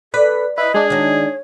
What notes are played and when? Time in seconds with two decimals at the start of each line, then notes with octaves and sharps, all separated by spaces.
0.14 A4 B4 D5 B6
0.58 E4 B4 D#5
0.74 G#3 D4 G#4
0.90 D#3 F#4 C#5